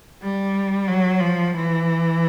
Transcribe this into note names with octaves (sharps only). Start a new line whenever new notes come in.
G3
F#3
F3
E3